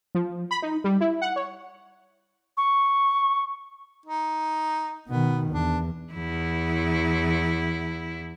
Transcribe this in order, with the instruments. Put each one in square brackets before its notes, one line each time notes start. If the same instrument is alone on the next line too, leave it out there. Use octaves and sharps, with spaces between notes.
[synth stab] F3
B5
D#4
G3
E4
F#5
C#5
[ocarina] C#6
[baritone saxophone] D#4
[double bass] B2 D#3 [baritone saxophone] B3
[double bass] E2 [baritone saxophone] D4
[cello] E2 E4